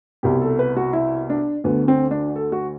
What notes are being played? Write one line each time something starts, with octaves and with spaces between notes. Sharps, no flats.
C2 B2 G4
A4
B4
F#4
E4
D4
D2 D3 B3
C4
D4
A4
F#4